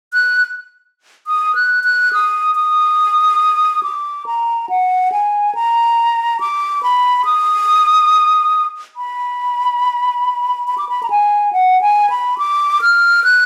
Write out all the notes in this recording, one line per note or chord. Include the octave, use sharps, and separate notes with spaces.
F#6
D#6
F#6
F#6
D#6
D#6
D6
A#5
F#5
G#5
A#5
D6
B5
D#6
B5
B5
D6
B5
A#5
G#5
F#5
G#5
B5
D6
F6
F#6